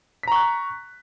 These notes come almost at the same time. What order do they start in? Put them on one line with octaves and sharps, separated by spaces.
B6 A#5 C#6 F#6